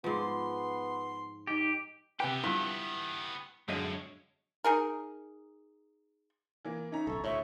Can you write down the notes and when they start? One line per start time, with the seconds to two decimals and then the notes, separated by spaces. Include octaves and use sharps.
0.04 G#2 F3 B3 C6
1.47 D#4 G4
2.20 C3 B3 G4 B4 G5
2.44 G2 F3 E4
3.68 F#2 A2 D3 G#3 D#5 F5
4.64 D#4 G#4 A#4
6.65 E3 A#3
6.92 C#4 D#4 E5 A#5
7.07 D1 B1 A4 C#6
7.24 D2 A2 C5 C#5 E5